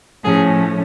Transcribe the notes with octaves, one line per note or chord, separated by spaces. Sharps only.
A2 F3 A3 C#4 G#4